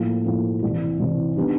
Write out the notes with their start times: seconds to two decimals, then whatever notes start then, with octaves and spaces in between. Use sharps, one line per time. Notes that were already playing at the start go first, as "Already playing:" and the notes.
Already playing: A2 F3 A#3
0.26 A2 F3 A#3
0.62 C2 C3 E3
0.99 C2 C3 E3
1.36 D#3 G3 B3 D4